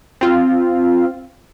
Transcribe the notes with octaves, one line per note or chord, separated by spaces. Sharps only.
C4 F4